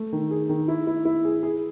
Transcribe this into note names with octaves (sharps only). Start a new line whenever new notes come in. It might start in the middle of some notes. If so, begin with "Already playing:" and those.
Already playing: A3
D#3
G#4
D#3
E4
E4
E4
G#4
G#4